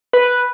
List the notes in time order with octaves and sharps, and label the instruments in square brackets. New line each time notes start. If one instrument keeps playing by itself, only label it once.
[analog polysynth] B4